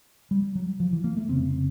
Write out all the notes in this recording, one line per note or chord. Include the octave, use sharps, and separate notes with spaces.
G3
F#3
F3
E3
A#3
A3
F1 F2 C#3 C4
C4